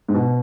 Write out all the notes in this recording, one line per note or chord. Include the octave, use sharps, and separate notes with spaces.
G#2
B2